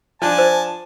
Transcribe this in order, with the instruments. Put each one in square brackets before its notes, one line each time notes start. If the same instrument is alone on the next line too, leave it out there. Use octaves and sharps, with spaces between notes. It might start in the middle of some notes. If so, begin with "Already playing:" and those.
[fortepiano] F3 D4 [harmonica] G#5 A5
[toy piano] C5